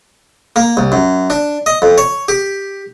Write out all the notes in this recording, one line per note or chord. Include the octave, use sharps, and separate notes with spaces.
A#3
C2
F#2
D4
D#5
F2
C#5
G4